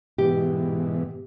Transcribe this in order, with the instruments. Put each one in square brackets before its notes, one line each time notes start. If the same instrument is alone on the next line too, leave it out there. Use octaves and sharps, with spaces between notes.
[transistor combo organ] G#2 B2 E3 [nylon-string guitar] G4